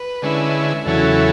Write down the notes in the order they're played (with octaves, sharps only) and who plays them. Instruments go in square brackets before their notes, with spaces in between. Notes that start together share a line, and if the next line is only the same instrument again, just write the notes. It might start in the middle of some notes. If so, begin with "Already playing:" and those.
Already playing: [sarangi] B4
[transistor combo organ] D3 G#3 C#4 E4
[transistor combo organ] E2 C#3 F#3 C#4 E4 [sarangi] A4